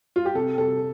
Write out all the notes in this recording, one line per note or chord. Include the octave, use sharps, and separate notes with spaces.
F4
G4
C3 A4
C3 A4